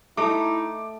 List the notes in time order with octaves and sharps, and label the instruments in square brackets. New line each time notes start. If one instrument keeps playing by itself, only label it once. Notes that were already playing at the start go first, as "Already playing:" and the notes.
[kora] A3 D#5 [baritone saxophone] D#4 [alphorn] E4 [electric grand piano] D6